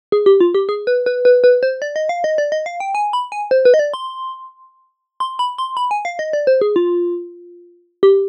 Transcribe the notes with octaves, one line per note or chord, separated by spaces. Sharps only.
G#4
G4
F4
G4
G#4
B4
B4
B4
B4
C5
D5
D#5
F5
D#5
D5
D#5
F5
G5
G#5
B5
G#5
C5
B4
D#5
D5
C6
C6
B5
C6
B5
G#5
F5
D#5
D5
C5
G#4
F4
G4